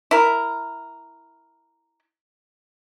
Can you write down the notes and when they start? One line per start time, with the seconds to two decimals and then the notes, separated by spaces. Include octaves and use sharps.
0.11 E4 A#4